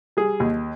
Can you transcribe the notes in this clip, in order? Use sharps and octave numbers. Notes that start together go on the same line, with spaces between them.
G3 G#4
D#2